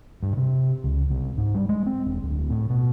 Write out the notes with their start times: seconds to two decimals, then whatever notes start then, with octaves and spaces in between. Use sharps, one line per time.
0.23 G2
0.37 C3
0.84 C#2
1.10 C2
1.37 G#2
1.55 G3
1.69 G#3
1.86 C4
2.06 E1
2.23 D1
2.50 A2
2.70 B2